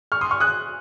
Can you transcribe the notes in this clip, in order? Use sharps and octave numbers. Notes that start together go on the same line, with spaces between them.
C#6 F6
C6 D#6
C#6 F6
D#6 F#6